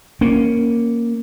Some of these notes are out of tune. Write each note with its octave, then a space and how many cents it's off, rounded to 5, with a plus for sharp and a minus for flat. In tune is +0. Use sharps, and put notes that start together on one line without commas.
A#3 +0 C#4 +0